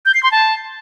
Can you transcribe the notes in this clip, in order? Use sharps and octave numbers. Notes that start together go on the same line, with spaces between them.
G6
C7
C6
A5